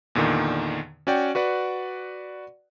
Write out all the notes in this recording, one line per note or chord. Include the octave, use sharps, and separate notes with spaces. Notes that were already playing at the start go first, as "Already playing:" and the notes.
E2 A#2 D3 D#3
C#4 F#4 D5 G5
F#4 B4 D5 F#5